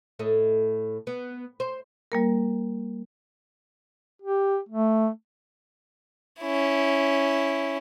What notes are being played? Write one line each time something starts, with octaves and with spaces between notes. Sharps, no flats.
A2 A4 D#5
B3
C5
G3 A#3 A#4
G4
A3
C#4 E4